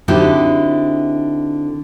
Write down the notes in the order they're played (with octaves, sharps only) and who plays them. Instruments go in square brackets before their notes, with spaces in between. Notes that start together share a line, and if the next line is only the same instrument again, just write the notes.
[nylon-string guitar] D3 C4 D#4 E4 F#4 G4